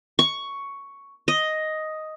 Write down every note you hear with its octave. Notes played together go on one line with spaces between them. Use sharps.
C#6
D#5